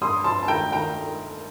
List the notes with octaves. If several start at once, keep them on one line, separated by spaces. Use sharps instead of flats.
G2 C6 D#6
G2 A5 C6
A5
D#3 G5 A#5
D#3 G5 A#5